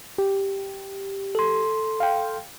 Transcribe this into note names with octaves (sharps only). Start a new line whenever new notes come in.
G4
A4 C6
F5 G5